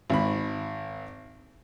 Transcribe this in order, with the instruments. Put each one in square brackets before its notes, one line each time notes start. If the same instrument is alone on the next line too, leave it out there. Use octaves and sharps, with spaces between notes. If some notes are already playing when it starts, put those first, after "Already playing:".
[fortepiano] G#1 B5